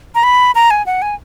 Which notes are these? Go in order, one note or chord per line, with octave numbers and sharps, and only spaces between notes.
A#5
B5
A#5
G#5
F#5
G#5